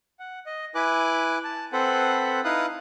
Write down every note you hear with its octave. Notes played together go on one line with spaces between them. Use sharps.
F#5
D#5
E4 B4 G#5 D6 F#6
A5
C4 A4 B4 C5 F#5 B5
D#4 E4 B4 F5 D#6 F#6